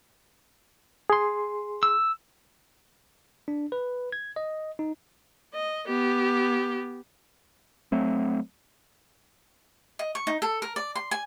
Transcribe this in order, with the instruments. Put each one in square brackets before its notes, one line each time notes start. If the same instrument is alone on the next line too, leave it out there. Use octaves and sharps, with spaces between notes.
[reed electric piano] G#4 C6
[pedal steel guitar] E6
[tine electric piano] D4
B4
G#6
D#5
D#4
[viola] D#5
B3 G4
[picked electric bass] F#3 A3 C4
[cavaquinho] D#5
C#6
D#4
A4
A#4
D5
C6
G#5